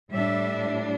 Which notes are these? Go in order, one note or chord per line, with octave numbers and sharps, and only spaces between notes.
A2 G3 D4 E5